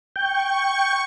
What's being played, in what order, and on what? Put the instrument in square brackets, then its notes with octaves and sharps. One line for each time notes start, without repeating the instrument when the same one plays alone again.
[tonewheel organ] G5 [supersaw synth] C#6